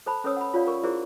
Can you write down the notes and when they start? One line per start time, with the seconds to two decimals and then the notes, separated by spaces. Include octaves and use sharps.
0.06 A4 C5 A5 B5
0.24 C#4 A4 B4 C#5 D#6 E6
0.37 F#5 B5
0.54 F4 G4 C#5 D5 F5
0.67 A#4 C#6
0.84 E4 G4 G#4 A#4 C5 D5